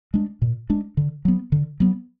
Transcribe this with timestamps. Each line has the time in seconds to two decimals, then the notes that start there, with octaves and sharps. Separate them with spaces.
0.14 G#3 D4
0.42 A#2
0.70 G#3 D4
0.97 D3
1.25 F#3 B3
1.52 D3
1.80 F#3 B3